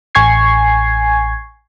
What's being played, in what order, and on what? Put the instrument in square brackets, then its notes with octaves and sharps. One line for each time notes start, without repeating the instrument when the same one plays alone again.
[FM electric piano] A1 G#5 C#6 G#6 C7